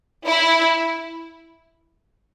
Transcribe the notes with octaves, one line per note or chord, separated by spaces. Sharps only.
E4